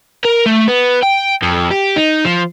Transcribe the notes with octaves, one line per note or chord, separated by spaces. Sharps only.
A#4
A3
B3
G5
F2
G4
D#4
F3